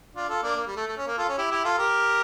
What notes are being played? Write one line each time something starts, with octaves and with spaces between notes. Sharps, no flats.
D4 F4
F4 A4
A#3 D4
A#3
G3
A3
A3
C#4
A#3
F4 A4
C#4
E4 G4
E4 G4
F4 A4
G4 A#4